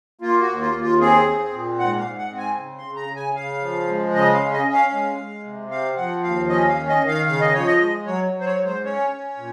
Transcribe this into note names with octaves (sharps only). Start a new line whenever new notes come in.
A#3 F4
F#4
D#2
F4
D#2
F4
C4 G#4
C4
A#2
G#2 F#5
F5
G#2
F#5
C4
G#5
C#3
C6
C#3
A#5
C#3
G#5
C#3 F5
F3
G#3
C#3 D#5
F5
C#4
D#5
C#4
F5
G#3
G#3
C3
C4 F5
F3 F#5
D#2 F5
C#4 D#5
F5
D#3
D#5
D#3
F5
C#3 F5
D#5
F3 C#5
D#5
G#3
F#3 C#5
F#3
C5
C#5
G#2
C5
C#4 C#5
C#4
A#2